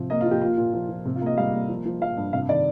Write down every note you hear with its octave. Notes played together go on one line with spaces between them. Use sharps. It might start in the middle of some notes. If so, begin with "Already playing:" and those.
Already playing: C3 F3
A#3 D#5
F4
F3
G4
A#3 F4
A#2
F3
F3
C3
F4
A#3
D#5
G3 F5
A#3
F3
F3
F3 F5
G2
C3 F5
D#3 D5